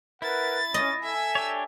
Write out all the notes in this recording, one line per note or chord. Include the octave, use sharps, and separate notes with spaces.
E4 A#4 B4 F#5 A6
C#4 D#5
A4 E5 G#5 E6
D4 G4 C#5